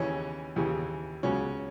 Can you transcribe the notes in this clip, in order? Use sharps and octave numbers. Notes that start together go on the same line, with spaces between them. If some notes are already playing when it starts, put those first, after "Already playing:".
Already playing: D#2 C#3 E3 C#4
D#2 C#3 E3
C#2 C#3 F#3 C#4